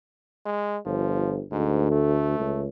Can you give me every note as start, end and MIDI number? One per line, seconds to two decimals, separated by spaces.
0.46 0.78 56
0.86 1.41 31
0.86 1.38 53
1.51 2.35 38
1.51 1.87 44
1.91 2.64 57
2.40 2.67 37